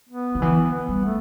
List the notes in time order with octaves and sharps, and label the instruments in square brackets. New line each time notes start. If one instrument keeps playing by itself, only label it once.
[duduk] B3
[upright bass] D3
[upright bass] E3 [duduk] B3
[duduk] B3
[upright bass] G3
[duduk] A3